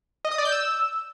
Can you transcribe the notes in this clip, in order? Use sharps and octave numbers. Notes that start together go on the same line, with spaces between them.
D#5
D#6
D5
G6
E6